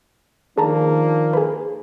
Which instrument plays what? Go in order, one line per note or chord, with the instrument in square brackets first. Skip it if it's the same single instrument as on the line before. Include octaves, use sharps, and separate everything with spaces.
[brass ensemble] D#3 F3 D4 [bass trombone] A#3 [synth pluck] G#4 A5 A#5
[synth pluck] G#4 B4